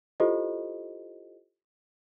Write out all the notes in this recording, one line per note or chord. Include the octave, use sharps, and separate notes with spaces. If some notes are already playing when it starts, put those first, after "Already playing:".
E4 F4 G4 A4 C5 D#5